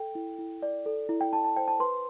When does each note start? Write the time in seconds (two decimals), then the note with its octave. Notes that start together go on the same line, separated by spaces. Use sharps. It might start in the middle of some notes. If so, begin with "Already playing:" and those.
Already playing: A4 G5
0.15 E4
0.38 E4
0.62 D5
0.86 A4
1.09 E4
1.21 G5
1.33 E4 A5
1.44 A5
1.57 C5 G5
1.68 A5
1.80 B4 C6